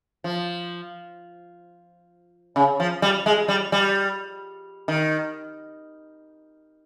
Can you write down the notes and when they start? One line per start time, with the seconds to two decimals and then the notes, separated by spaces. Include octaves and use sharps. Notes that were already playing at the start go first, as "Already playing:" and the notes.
0.24 F3
2.56 C#3
2.80 F3
3.02 G3
3.26 G#3
3.48 G3
3.72 G3
4.88 D#3